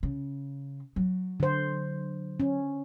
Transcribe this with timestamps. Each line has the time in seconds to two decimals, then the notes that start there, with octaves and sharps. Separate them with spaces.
0.03 C#3
0.96 F#3
1.40 D3 C5
2.40 C#4